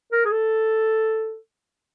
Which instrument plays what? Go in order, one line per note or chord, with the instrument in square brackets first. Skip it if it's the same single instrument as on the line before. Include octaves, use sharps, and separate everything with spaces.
[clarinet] A#4
G#4
A4